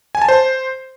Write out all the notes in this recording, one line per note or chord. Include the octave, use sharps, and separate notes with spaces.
G#5
A5
C5